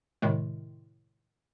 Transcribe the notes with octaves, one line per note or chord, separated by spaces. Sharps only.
A2 C3 D#3 G#3